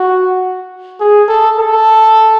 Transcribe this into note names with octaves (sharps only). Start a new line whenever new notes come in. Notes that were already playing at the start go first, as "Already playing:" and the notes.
Already playing: F#4
G#4
A4
A4